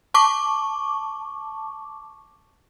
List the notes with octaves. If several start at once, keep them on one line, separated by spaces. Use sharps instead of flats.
A5 C#6 D6